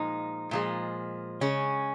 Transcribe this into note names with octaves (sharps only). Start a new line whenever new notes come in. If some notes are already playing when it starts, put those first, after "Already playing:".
Already playing: A#2 F3 G#3 D#4
A#2 F3 G#3
C#3 G#3 C#4